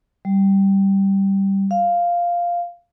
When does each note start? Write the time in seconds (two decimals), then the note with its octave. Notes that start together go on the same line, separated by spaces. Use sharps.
0.25 G3
1.71 F5